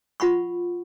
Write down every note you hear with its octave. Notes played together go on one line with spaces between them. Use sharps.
F4 F#5 B5 C#6